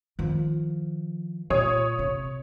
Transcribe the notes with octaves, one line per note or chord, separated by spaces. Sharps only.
D#3 F3
A#2 C#5 D#6
C3